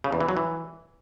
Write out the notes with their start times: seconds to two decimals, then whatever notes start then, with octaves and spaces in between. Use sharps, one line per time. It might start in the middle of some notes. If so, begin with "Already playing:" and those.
0.04 C#3
0.12 E2
0.20 E3
0.29 F#3
0.37 E3